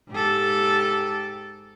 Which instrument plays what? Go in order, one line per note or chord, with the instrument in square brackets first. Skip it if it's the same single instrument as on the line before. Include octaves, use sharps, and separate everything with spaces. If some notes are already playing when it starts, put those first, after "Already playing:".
[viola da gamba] G#2 G4 A4